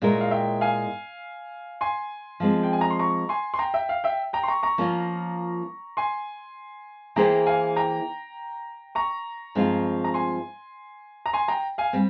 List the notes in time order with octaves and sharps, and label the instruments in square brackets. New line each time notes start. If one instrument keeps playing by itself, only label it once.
[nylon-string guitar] A#2 G#3 E4 A#4 C#5
[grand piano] F5
E5 G5
F5 G#5
G#5 C6
[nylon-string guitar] F3 G#3 C4
[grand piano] G5
G#5
A#5
C6
A#5 C#6
G#5 C6
C6
G5 A#5
E5 G5
F5
E5 G5
G5 A#5
C6
A#5 C#6
A#5 C#6
[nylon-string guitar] F3 A#3 C#4 F4
[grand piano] G#5 C6
[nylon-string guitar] E3 A#3 E4 G#4 C5 [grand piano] G5 A#5
[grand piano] F5 G#5
G5 A#5
A#5 C#6
[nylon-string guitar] G2 F3 G#3 C4 F4
[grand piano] A#5
G#5 C6
A#5
G#5 C6
G5 A#5
F5 G#5
[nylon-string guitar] G3 C4